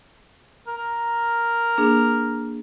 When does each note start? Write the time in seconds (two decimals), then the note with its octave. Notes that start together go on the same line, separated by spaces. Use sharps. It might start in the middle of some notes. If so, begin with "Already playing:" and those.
0.67 A#4
1.78 A#3 D4 G#4